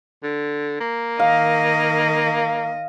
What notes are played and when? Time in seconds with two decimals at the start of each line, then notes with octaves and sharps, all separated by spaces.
0.23 D3
0.80 A#3
1.20 D#3 D#5 F5